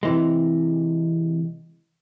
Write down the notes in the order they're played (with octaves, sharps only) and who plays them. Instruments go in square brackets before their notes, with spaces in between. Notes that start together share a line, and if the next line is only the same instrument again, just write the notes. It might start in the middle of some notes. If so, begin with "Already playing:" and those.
[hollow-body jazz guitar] C3 E3 G#3